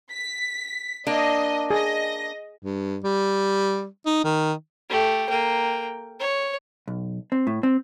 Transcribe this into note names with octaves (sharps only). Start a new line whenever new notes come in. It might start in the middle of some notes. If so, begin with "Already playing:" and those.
B6
A#3 D4 D#5
G#4 D#5 A#6
G2
G3
D#4
D#3
A3 G4
A#3 G5
C#5
B1
C4
A2
C4